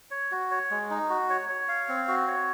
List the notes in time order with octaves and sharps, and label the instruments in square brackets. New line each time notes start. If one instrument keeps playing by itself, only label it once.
[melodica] C#5
F#4
C#5
G#3
D#4
F#4
C#5
C#5
F5
C4
F#4
C#5